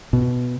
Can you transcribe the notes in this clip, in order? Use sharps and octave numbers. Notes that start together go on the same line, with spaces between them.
B2